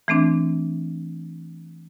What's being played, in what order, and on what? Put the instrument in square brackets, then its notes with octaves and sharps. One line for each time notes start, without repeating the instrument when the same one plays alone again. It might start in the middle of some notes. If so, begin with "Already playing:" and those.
[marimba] E3 A3 C4 D4